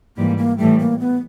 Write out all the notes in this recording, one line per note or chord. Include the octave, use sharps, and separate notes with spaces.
G#2 E3 G3 A#3
A#3
A2 E3 G3 A3
A#3
B3